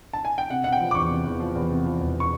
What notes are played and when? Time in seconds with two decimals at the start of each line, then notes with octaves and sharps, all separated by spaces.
0.13 A5
0.25 G#5
0.38 G5
0.50 C3 F#5
0.64 C3 F#5
0.72 G5
0.80 F3
0.91 D6
0.95 E2 C#6
1.10 C3
1.26 E2
1.40 F3
1.55 E2
1.70 C3
1.85 F3
2.00 E1
2.20 C#6